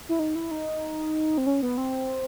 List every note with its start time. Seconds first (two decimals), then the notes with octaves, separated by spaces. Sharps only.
0.09 E4
0.19 D#4
0.35 E4
0.51 D#4
1.38 C4
1.46 C#4
1.62 B3
1.78 C4